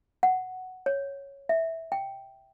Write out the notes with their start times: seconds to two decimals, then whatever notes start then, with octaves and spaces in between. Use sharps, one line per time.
0.23 F#5
0.86 C#5
1.49 E5
1.92 G5